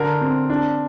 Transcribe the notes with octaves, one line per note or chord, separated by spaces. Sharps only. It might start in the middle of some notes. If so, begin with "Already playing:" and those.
Already playing: D3 D4 A#4
C4
D4